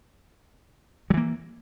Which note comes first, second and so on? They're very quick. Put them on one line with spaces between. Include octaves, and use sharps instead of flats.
F#3 E3 A#3